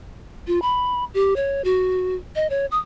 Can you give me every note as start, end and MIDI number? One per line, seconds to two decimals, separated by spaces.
0.47 0.61 65
0.62 1.04 83
1.14 1.34 67
1.36 1.64 73
1.64 2.15 66
2.35 2.49 75
2.50 2.66 73
2.71 2.79 87